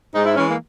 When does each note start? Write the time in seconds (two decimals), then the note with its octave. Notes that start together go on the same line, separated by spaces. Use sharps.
0.15 G#2 D#4
0.25 E4
0.36 E3 G#3 C#4
0.48 A#3